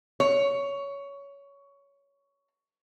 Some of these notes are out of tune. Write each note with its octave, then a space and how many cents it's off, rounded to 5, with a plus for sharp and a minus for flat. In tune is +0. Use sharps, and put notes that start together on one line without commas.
C#5 +15